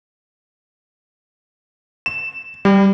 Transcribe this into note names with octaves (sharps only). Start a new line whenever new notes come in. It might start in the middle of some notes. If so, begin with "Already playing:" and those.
E7
G3